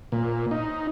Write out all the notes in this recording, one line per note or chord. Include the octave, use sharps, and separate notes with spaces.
A#2
D#4